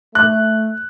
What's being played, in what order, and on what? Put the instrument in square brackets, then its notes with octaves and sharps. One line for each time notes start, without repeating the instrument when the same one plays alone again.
[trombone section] A3 [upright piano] F#6